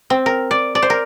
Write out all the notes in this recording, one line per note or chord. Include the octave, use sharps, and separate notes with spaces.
C4
A#4
D5
D5
C5
A#4